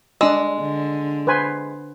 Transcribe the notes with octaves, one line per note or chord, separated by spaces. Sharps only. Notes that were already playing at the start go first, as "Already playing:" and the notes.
G#3 D4 E6
D3
B4 C5 G#5